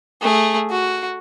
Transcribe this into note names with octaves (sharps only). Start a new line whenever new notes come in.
A3 G#4
F#4